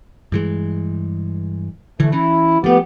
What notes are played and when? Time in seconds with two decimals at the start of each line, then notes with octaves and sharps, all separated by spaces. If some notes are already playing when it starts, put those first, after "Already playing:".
0.32 G2 E3 G#3
2.00 D3 E3 A3
2.12 E3 C#4 E4
2.64 F3 A3 B3 G4